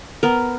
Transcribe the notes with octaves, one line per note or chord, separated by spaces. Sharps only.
B3 A#4